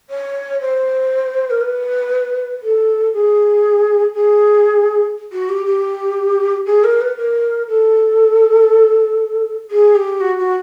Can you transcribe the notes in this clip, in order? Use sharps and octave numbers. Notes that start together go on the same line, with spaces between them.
C#5
C5
A#4
B4
A4
G#4
G#4
F#4
G4
G4
G#4
A#4
B4
A#4
A4
G#4
G4
F#4
F#4